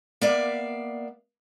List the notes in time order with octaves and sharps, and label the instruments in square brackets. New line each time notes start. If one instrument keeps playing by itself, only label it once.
[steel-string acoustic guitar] A#3 B3 D5 E5 F5